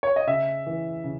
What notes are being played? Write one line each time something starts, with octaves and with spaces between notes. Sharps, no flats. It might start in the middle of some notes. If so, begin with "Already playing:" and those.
C#5
D#5
C#3 E5
E3
C#3